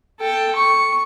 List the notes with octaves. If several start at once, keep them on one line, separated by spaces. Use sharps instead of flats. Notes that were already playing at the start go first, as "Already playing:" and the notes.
A4 G5
C#6